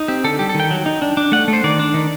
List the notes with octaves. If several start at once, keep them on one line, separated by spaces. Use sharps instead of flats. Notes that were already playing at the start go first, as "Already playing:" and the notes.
Already playing: D#4
C4 G4
D3 A4
G3 G4
A4
D#3
G5
F#3
D#4
D4
D4
A3 F#5
A3
C5
D#3 D5
D4
D#3